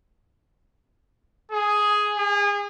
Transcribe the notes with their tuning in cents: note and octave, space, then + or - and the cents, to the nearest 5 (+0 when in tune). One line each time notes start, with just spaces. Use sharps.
G#4 +5
G#4 -35